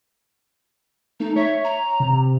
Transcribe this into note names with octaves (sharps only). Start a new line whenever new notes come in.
A3 D#4
C#5 E5
A#5
C3